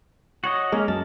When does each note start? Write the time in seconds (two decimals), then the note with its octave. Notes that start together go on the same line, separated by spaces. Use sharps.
0.44 F#4 C#5 D#5
0.72 G#3 A#3 C#4
0.88 F#2 A5